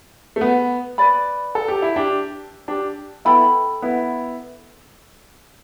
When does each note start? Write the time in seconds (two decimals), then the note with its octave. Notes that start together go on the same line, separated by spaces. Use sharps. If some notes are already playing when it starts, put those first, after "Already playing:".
0.36 A3
0.41 B3
0.98 B4 D5 B5
1.55 A4
1.68 G4
1.82 E4
1.96 D4 G4
2.68 D4 G4
3.25 B3 E4 A4 G5 B5
3.82 B3 E4